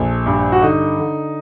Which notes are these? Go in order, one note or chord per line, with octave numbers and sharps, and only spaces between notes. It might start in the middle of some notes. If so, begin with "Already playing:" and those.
Already playing: A#1 A4
G2
F#4
D3 D#4
D3